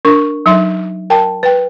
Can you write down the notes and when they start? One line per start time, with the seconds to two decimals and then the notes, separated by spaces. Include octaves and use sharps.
0.05 D4 A#4 C#6
0.46 F#3 D#4 E5 C6
1.10 A#4 G5 A5
1.43 B4 G5